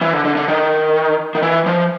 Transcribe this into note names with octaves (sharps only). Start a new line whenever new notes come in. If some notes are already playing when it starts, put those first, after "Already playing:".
E3
D3
D3
D3
D#3
D#3
E3
F3